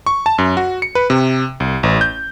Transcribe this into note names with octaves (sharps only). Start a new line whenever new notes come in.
C#6
A5
F#2
F#4
C#7
B4
C3
C2
A1
G6